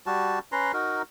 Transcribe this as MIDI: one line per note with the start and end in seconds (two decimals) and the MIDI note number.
0.06 0.39 55
0.06 0.39 66
0.06 0.39 81
0.52 0.72 61
0.52 0.72 71
0.52 0.72 82
0.52 0.72 84
0.73 1.02 63
0.73 1.02 66
0.73 1.02 70